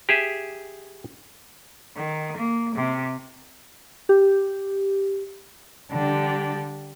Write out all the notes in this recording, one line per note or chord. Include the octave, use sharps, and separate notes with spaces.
G4 G#4 E5
D#3
A#3
C3
G4
D3 G3 D4 G4